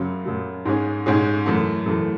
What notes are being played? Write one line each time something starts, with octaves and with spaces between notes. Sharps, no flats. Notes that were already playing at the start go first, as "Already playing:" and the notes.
Already playing: F#2 C#3 F#3
F#2 C#3 F#3
G#2 G#3 C#4 G#4
G#2 G#3 C#4 G#4
F#2 E3 A3
F#2 E3 A3